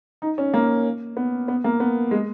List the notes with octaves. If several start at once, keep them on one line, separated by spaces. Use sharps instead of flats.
D#4
C#4
A#3
B3
B3
A#3
B3
G#3